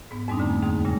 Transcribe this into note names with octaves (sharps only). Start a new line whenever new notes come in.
G#2 B3
F2 G#2 G3 C4 D4 D#4
D3 A3 A#3
D#2 C4 D#4 G#4
F#2 A#2 C#3 G3 G#3